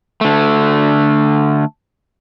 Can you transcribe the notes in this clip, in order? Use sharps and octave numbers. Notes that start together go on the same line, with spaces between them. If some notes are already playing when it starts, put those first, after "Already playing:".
D3 A3